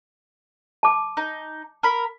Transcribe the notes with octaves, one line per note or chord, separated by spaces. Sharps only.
A5 D6
D#4
A#4 B5